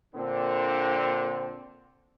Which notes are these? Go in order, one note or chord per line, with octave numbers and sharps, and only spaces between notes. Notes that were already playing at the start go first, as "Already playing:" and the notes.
A#2 D3 C4